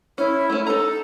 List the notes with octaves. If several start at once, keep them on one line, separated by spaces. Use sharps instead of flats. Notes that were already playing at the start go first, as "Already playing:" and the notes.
C#4 E4
A3 C#4
D#4 A4 A#5